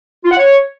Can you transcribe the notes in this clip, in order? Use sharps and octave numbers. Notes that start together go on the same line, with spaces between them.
F4
F#5
C#5